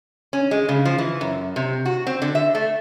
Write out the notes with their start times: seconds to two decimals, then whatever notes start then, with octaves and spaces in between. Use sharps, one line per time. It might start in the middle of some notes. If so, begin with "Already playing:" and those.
0.33 C#4
0.51 G#3
0.69 C#3
0.86 F3
0.98 E3
1.21 F#2
1.56 C3
1.85 F#4
2.07 C4
2.22 D3
2.35 E5
2.55 A3